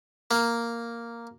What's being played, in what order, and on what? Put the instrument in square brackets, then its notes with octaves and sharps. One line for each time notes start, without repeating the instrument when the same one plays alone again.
[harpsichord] A#3